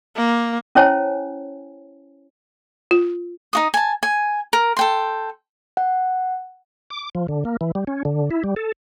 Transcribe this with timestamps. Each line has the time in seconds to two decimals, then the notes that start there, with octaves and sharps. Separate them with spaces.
0.17 A#3
0.75 C#4 E4 C5 C#5 G#5 A5
2.91 F4
3.53 D#4 F#4 D#6
3.74 G#5 A5
4.03 G#5
4.53 A#4
4.77 A4 G5 C6
5.77 F#5
6.90 D6
7.15 F3
7.29 D3
7.45 A#3
7.61 E3
7.75 G3
7.87 C#4
8.05 D3
8.31 E4
8.44 G3
8.56 A4